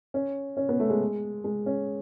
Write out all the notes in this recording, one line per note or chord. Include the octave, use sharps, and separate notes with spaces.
C#4
C#4
B3
A3
G#3
G#3
C#4